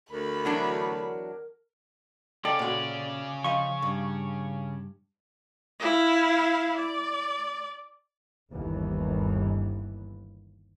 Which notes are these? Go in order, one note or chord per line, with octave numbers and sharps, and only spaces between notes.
D2 A#4 B5
E2 F#3 D4
C#3 C#4 A4 D5 D#5 G5
A#2 F#4 A4 C5 F#5
F3 D#5 F5 C#6
G2
E4 F5
D5
G1 D#2 E3